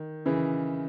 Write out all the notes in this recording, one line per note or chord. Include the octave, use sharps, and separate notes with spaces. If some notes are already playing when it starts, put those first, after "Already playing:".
Already playing: D#3
C#3 E3